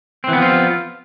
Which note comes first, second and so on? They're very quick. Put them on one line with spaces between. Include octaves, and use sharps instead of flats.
C4 E3 B3 F3 F4